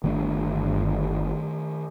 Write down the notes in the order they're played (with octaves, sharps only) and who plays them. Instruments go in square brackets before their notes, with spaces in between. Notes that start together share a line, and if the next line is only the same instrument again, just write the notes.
[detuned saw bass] G1 [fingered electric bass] D#3 A3 D4